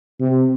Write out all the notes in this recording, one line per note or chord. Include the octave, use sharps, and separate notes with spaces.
C3